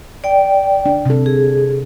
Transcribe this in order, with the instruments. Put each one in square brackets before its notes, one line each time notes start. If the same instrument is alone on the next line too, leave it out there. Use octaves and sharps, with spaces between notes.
[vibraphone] D5 G5
[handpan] D4
C3 A4
[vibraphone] G#4